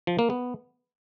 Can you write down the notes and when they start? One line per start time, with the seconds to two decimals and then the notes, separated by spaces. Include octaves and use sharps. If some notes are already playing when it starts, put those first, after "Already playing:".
0.07 F3
0.19 A#3
0.30 B3